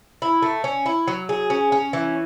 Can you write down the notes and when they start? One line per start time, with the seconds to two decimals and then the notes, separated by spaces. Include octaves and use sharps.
0.22 E4
0.42 A3
0.64 C#4
0.86 E4
1.08 F#3
1.29 G#4
1.50 C#4
1.72 C#4
1.93 E3